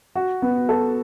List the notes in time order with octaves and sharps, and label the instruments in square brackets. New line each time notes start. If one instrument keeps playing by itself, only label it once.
[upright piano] F#4
B3
A4